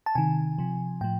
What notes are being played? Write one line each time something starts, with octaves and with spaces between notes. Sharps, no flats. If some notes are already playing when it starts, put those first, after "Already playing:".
A5
C3 D#3 G#5
C3 F3
A2 F3 G5